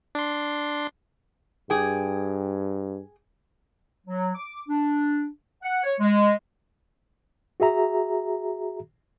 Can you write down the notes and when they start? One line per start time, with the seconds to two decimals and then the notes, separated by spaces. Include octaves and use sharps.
0.15 D4 C6
1.70 G2 G#4 G5
4.07 F#3
4.35 D6
4.67 D4
5.63 F#5
5.83 C#5
6.00 G#3
7.60 F#4 G#4 E5 A#5